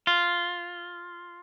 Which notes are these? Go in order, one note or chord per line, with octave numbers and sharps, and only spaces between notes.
F4